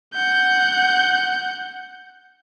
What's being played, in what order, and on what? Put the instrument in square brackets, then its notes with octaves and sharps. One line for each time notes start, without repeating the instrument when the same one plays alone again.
[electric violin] F#5 G6